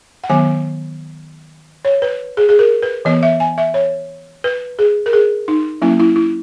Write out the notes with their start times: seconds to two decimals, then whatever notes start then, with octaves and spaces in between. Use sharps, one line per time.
0.24 F#5
0.29 D#3 F#3 B3 G#5
1.85 C#5
2.02 B4
2.37 G#4
2.49 G#4
2.59 A#4
2.82 B4
3.05 E3 B3 D#5
3.23 E5
3.40 G#5
3.58 E5
3.74 C#5
4.44 B4
4.79 G#4
5.06 A#4
5.13 G#4
5.48 D#4
5.82 F#3 A#3 C#4 E4
6.00 E4
6.16 E4